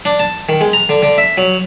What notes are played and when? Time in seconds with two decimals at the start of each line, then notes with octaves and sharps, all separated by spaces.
0.05 D4
0.20 A5
0.49 D#3
0.61 G#3
0.73 A#5
0.89 D3
1.03 D3
1.18 E5
1.38 F#3